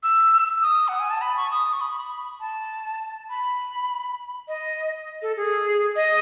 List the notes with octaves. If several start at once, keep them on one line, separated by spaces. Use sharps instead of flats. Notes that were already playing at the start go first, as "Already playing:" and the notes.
E6
D#6
F#5
G#5
A5
B5
C#6
D#6
C#6
B5
A5
B5
D#5
A4
G#4
D#5